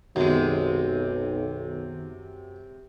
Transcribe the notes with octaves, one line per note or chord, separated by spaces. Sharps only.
B1 F#2 C3 D#3 G#3 B3 D#4